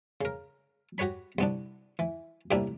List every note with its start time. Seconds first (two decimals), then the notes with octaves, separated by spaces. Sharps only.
0.21 C#3 A#4
0.98 F#4 G4 B4 C#5 B5
1.38 C2 B3 D4
1.99 E3
2.51 A2 C3 G3 A#3 D4 E4